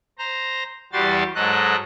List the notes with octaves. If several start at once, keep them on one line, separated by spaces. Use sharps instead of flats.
C5 A#5
E2 G3 F#4 G4 C6 A6
G#2 F#3 A4 D#5 F#6